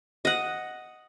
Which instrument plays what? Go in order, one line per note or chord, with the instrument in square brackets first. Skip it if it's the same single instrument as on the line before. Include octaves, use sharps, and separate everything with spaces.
[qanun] D#5 F#5